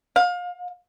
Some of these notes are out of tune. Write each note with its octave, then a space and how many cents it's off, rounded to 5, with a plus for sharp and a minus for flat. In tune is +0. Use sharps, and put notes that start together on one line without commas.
F5 +30